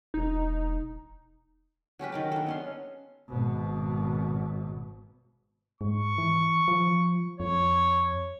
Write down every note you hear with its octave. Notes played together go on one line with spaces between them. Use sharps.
E1 D#4
F#3 C#4 G4 B4
D#3 A#4 A5
D4 A4
B3 C#4 C6
G#1 B2
G#2 C#6
E3
F3
F2 C#5